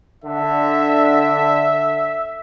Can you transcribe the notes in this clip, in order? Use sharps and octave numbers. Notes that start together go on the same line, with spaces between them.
D3 E5